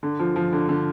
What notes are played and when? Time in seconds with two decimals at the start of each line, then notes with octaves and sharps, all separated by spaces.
0.03 D3
0.19 F3
0.36 F3
0.52 D3
0.69 D3